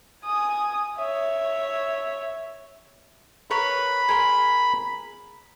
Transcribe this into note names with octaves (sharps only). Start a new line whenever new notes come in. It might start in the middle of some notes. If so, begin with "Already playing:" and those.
G#5 D#6
C#5 E5
A#4 B4 C#5 B5
G#4 A#4 C6